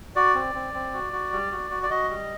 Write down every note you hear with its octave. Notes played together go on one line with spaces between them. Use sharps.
F#4 D5
C4
C4
C4
F#4
F#4
G3
F#4
F#4
D5
F#4 D#5
G3